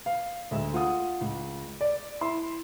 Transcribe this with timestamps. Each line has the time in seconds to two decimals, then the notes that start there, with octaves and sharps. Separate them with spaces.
0.06 F5
0.51 D2 G#3 E5
0.74 F4 F#5 D#6
1.21 C#2
1.81 D5
2.21 E4 E5 C6